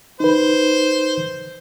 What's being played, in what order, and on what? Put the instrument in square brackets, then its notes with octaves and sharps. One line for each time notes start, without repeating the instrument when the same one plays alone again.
[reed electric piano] D#4 B4 [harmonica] C5